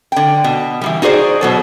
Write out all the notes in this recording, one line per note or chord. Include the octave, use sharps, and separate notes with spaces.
D3 G5
B2
E3 F3 G3
D#4 F#4 G#4 C5 D5
B2 F#3 A4